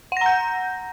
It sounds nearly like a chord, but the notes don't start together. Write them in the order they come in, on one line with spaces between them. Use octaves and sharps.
F#5 A#6 A#5 G6